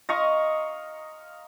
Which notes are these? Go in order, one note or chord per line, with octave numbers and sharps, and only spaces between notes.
D#5 F5 A#5 C#6